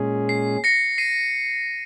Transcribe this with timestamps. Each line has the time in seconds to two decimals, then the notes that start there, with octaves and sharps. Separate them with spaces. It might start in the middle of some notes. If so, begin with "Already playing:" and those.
Already playing: A#2 G#3 C#4 G#4
0.29 C7
0.64 A#6 C#7
0.98 C7 D#7